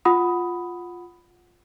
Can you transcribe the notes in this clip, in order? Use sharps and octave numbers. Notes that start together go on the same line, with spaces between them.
F4 F#5 B5 D#6